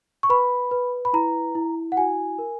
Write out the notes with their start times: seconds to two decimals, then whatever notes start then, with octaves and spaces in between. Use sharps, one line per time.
0.23 C#6
0.30 B4 B5
0.71 B4
1.05 B5
1.13 E4 A#5
1.55 E4
1.92 F#5
1.97 F#4 G#5
2.39 A#4